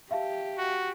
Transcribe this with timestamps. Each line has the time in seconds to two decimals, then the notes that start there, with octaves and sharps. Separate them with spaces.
0.11 G4 E5 F5 A5
0.58 F#4